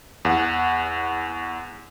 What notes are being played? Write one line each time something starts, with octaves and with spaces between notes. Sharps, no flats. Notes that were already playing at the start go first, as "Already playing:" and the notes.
E2 F#5